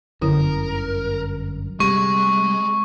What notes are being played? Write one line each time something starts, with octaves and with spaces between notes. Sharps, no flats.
G1 F#2 D3 E4 A#4
C3 G3 G#3 C#6